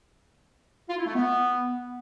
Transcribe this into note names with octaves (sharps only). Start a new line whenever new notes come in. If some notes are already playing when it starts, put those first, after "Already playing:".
F4
E4
A3
B3